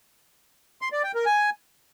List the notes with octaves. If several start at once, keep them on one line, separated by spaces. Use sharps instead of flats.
C6
D5
G5
A#4
G#5